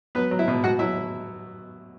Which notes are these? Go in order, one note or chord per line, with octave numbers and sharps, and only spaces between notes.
F#3 B3 B4
F#3
E4 E5
B2
B2 F#4 F#5
F#3 E4 E5